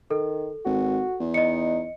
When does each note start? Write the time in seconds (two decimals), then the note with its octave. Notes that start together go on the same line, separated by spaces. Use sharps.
0.11 D#3 A4
0.65 G#1 F#4
1.20 E2
1.34 D#4 D#5 C#7